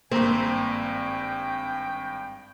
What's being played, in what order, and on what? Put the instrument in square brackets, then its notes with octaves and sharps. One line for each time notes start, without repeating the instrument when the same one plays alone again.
[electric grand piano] G#1 G2 [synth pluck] A#3 A#5 [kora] C4 [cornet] G5